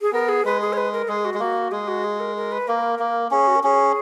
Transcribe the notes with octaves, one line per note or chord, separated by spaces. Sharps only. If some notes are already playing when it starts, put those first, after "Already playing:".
G#4
B3 A#4
G#4
G#3 B4
G#4
C#5
B4
A#4
G#3 G#4
F#4
G#3
A#3 F#4
G#3 G#4
F#4
G#4
A#4
A#4
B4
A#3 A#4
A#3
C#4 G#4
F#4
A#4
C#4 G#4